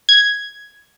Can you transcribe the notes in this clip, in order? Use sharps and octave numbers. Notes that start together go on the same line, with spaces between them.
G#6